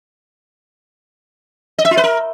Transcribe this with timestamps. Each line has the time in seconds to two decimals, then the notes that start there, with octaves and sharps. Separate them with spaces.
1.78 D#5
1.85 E5
1.91 F4
1.97 B4
2.04 A#4